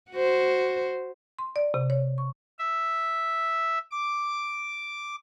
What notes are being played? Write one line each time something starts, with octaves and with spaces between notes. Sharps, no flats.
F#4 C5
C6
D5
C3
C#5
C#6
E5
D6